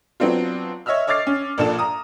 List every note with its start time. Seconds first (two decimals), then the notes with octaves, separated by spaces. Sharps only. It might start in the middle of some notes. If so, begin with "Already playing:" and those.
0.20 F#3 B3 C4 D4 F4
0.86 C#5 D#5 E5 E6 F6
1.07 C#5 D#5 D6 F6 A6 C7
1.27 C#4
1.58 A#1 A#2 D4 A4 E7
1.79 A#5 D#6